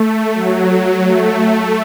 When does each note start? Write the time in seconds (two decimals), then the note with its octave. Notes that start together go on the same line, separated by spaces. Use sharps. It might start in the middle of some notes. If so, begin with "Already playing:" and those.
Already playing: A3
0.34 F#3
1.04 A3